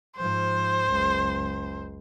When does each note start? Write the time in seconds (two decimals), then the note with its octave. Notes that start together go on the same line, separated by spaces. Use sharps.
0.17 G#2 F3 C5
0.89 F#1 C#2